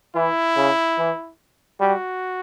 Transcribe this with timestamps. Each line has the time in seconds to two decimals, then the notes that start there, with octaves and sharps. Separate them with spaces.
0.15 E3 E4
0.57 C#3
0.98 E3
1.80 G3 F#4